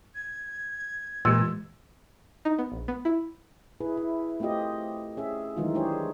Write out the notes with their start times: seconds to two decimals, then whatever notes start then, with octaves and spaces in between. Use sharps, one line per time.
0.15 G#6
1.25 A#2 E3 G#3 G4 E6
2.45 D#4
2.59 B3
2.72 A#1
2.88 B3
3.05 E4
3.81 E4 G#4 B4
3.97 E4
4.40 A3 C4 F4 G4 D#5
5.17 C#4 G#4 E5
5.57 D#3 E3 F#3 G#3 D#4 F4
5.74 G#3 D4 G4 G#4 C5 C#5